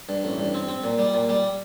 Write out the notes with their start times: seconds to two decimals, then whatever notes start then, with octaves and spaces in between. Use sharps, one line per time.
0.09 G2
0.24 A1
0.39 G2
0.54 C4
0.69 C4
0.84 A#2
0.99 G3
1.14 A#2
1.29 G3